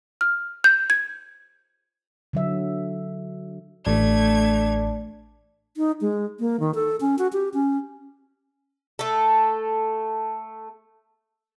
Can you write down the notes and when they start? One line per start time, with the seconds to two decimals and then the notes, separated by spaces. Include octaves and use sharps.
0.21 F6
0.64 G6
0.90 G#6
2.33 D3 F#3 E5
3.87 A1 A3 D4 G#6
5.77 D#4
6.01 G#3
6.40 A#3
6.60 D#3
6.75 A4
7.01 C#4
7.19 F#4
7.33 G4
7.54 C#4
8.99 A3 A4